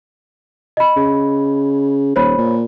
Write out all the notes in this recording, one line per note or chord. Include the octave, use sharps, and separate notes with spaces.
D#5 B5
C#3
D#1 C5 C#5 B5
A#2